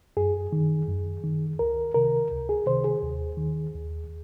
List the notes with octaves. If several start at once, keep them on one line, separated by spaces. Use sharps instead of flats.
F#2 G#4
D#3
F#2
D#3
C#2 A#4
C3 D#3 A#4
C#2
G#4
C3 D#3 C5
G#4
D#2
D#3
D#2